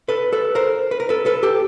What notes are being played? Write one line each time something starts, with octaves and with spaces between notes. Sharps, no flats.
A4 B4
A4 B4
A#4 C5
B4
A#4
A4 B4
A4 B4
G4 A4